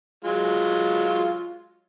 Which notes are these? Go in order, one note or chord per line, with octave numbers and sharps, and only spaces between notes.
F#3 G#3 F4